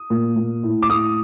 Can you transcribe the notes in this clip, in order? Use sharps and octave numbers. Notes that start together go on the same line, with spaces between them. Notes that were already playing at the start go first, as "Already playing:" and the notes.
Already playing: D#6
A#2
A#2
A2
D6
A2 D#6